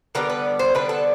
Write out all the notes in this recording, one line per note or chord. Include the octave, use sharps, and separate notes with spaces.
D3 G3 B3 D4 A#4
B4
C5
D3 G3 B3 D4 B4
A4